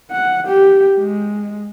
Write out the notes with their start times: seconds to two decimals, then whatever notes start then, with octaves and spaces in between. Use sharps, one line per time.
0.11 F#5
0.47 G4
0.98 G#3